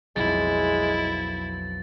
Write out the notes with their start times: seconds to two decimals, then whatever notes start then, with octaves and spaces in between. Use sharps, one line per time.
0.16 B1 F2 G#3 E4 A6